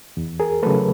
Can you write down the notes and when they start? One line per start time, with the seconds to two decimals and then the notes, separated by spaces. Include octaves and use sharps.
0.17 E2
0.40 G#4 A#4
0.63 C#3 F#3 A3 A4 B4